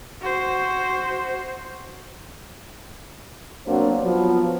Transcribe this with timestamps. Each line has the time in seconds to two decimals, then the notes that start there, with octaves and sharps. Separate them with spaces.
0.22 F#4 C5
3.67 B2 F#3 A#3 C4 D4 C5
4.02 F3 F#3 B3